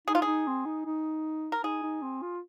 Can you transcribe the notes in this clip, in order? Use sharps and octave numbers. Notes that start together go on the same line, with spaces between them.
D#4 G#4
F4
D#4 G#4
C4
D#4
D#4
A#4
D#4 G#4
D#4
C4
F4